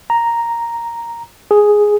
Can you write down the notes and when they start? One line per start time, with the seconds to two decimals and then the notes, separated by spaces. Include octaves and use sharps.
0.10 A#5
1.51 G#4